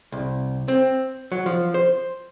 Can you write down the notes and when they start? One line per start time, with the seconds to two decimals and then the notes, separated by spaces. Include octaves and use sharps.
0.12 C2
0.68 C4
1.32 F#3
1.46 F3
1.74 C5